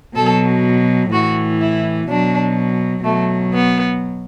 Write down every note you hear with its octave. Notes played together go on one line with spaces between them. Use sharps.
B2 F#3 A4
A2 E3 F#4
E4
B2 F#3 D4
B2 F#3 A3
B3